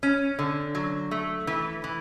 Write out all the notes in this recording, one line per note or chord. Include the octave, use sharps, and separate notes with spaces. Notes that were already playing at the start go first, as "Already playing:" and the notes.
C#4
D3
F#3
A3
E3
E3